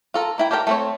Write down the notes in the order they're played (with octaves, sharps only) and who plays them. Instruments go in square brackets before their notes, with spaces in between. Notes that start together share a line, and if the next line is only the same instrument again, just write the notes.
[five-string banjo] F4 A4 A#4
A#3 E4 G5
G4 A4 A#4 D5 G5
A3 C4 C#5